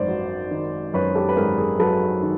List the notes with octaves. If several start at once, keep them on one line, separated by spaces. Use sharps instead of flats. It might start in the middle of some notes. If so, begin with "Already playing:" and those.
Already playing: G#1 F#2 C5 D5
F#3
D#3
F#2 B4 C#5
G4 A4
B4
G#1 G#4 A#4
G#4 A#4
F#3 A4 B4
D#3